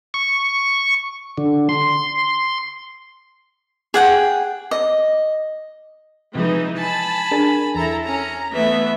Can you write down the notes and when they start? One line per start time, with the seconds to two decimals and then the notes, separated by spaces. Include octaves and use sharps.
0.14 C#6
1.38 D3
1.69 C6
3.94 G#4 F#5 G5
4.71 D#5
6.35 C3 E3 F3 G#3 D#4
6.78 G#5 A5 B5
7.31 D4 G#4 A#4
7.75 E2 E4 A4 A#5
8.05 C#4 A#5
8.53 E3 A3 B3 E5